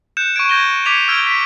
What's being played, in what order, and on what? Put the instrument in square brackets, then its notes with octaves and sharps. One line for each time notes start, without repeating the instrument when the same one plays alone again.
[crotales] F#6 G6 C#7 E7
C#6 G6 G#6 D7
G6 G#6 A#6 D#7 G7
D6 G#6 B6 C#7 D#7 F7
E6 F6 G6 G#6 D7 D#7
B6 E7